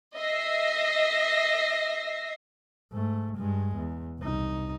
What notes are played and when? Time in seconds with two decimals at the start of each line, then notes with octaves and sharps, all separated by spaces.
0.15 D#5 E5 A#6 C7
2.92 G#2 A3
3.36 G2 G#3
3.76 E2
4.20 C2 D#4